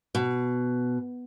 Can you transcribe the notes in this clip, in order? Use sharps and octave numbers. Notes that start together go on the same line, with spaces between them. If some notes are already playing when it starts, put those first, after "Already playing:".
B2